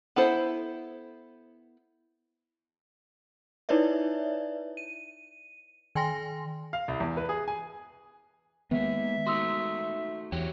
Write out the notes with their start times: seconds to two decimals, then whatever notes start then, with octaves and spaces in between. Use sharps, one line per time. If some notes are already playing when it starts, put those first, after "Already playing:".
0.16 B3 E4 A4 C5
3.69 D#4 E4 B4 C#5 D5 E5
4.77 D#7
5.95 D#3 G5 G#5 C6 A#6
6.73 F5
6.88 C2
7.00 E2
7.17 B4
7.29 G#4
7.48 G#5
8.71 D#3 G#3 A#3 B3 E5
9.27 A3 D#4 F#4 C6 D#6 E6
10.32 E2 F#4 G4 C#5 G5